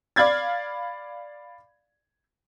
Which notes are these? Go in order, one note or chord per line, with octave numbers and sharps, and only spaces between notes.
D5 F5 B5 G#6 A6